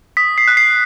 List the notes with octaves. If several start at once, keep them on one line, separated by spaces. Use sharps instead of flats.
D#6 B6
C7
F#6
C7